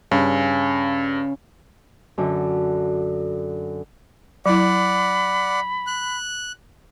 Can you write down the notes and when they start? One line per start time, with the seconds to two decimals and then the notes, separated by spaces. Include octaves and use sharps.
0.11 G2 C#3
2.18 F#2 D3
4.46 F#3 E4 D5 F#5 B5
5.87 F#6